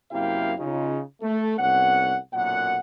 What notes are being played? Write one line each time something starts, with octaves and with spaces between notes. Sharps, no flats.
F#2 C3 A#3 E4 F5 G5
C#3 D#4 F4
A3
C2 B3 C#4 F#5
B1 F#2 A#2 F#5